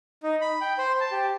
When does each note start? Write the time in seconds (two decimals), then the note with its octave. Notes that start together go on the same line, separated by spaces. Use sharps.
0.23 D#4
0.41 B5
0.61 G5
0.78 C5
1.00 A5
1.12 G4